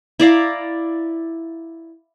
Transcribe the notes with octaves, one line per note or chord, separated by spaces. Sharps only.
E4 D5 F5 A#5